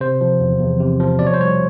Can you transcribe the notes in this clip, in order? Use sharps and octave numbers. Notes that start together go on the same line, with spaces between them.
C3 C5
F3
E2
E2
C3
F3
B2 D5
C#5
C5
G3 C#5